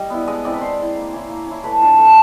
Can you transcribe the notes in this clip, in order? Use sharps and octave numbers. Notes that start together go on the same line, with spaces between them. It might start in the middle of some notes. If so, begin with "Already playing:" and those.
Already playing: G3 D#5
B3 E4
G#3 D#5
C4 E4 D5
B4
G#3 C5
C4 E4
A#3
C#4 E4
A#3
C#4 E4
A3 B4
D4 F4
A3